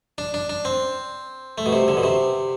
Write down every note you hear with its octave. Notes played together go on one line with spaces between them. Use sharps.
D4
D4
D4
C4
A3
B2
C3
D3
B2
C3